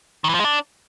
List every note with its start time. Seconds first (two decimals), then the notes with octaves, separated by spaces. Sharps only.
0.24 D#3
0.29 E3
0.34 F3
0.39 G#3
0.44 D4